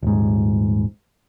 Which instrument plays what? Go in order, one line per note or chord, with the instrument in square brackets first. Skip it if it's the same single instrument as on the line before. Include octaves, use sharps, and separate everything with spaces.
[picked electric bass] D#1 G#2